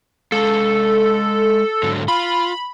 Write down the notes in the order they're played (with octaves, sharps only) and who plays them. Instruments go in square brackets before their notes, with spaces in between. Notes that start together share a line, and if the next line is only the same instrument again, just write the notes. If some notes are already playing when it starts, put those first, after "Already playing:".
[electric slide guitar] G#3 F5 [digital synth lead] A4
[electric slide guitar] G#2 D3 F#3
[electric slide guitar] F4 [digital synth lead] B5